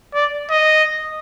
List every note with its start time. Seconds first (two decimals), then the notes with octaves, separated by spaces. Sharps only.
0.14 D5
0.51 D#5